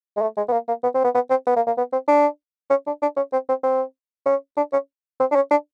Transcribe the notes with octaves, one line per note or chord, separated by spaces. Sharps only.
G#3
A3
G#3
B3
A#3
A#3
B3
C4
B3
B3
C4
B3
A#3
A#3
B3
C4
D4
C#4
D4
D4
C#4
C4
C4
C4
C#4
D4
C#4
C4
D4
C#4
D4